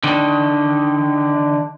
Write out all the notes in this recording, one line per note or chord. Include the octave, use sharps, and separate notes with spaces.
D3 D#3